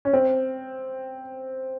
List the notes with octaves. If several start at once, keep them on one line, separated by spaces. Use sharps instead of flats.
C#4
C4